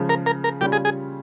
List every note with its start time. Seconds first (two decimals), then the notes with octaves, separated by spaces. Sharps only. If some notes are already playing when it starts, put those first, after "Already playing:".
Already playing: C#3 F3 G#3
0.09 A#4
0.26 A#4
0.44 A#4
0.61 C#3 G3 C#4 F4 G4
0.72 G#4
0.85 G#4